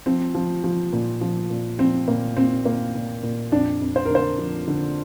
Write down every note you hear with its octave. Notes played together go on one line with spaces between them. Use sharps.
F3 C4
F3
F3
A#2
F3
A#2
F3 C4
A#2 A#3
A#2 C4
A#2 A#3
A#2
A#2
F2 D4
F2
C5
D3 A#4
C5
F3
D3